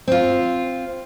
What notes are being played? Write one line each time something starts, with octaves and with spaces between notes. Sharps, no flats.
C4 F4